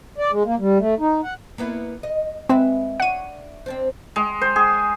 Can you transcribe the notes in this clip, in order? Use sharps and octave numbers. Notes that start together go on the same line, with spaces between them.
D5
G#3
A#3
G3
A3
D#4
F#5
A#3 B3 E4
D#5
G#3 C4 B4 E5
D4 C#5 F#5 D#7
C4 D4 C5
G#3
C5
G#4